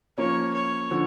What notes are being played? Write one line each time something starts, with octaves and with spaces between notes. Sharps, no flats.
F3 A#3 C#4 C#5
C#5
D3 F3